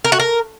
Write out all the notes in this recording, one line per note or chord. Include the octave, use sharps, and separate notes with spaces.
A#4
F#4
A#4